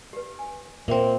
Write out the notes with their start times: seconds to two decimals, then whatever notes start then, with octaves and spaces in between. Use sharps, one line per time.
0.13 G4 B4
0.39 G#5
0.88 A#2 A#3 C4 A#4 E5 G5